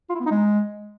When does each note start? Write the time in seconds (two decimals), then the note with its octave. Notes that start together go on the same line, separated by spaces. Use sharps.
0.09 F4
0.15 E4
0.20 B3
0.26 D#4
0.31 G#3